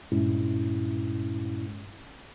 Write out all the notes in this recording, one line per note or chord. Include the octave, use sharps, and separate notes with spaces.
G2 A#2 G#3 C#4 E4